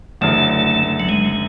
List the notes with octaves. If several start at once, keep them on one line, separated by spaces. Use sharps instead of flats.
F#1 F#2 D3 A3
F#3
G#3